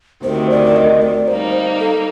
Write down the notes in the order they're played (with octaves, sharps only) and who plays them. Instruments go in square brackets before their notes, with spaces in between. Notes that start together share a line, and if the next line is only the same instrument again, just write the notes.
[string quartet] D2 C3 D#3 [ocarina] C5
[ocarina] D5
D#5
D5
[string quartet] G3 A#3 D#4 [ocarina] C5
[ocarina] A4